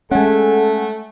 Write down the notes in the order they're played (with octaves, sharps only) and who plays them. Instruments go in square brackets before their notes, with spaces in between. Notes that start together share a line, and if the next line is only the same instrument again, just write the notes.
[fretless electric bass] G#3 C#4 [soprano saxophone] A3 [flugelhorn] A4 [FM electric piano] F#5 G#5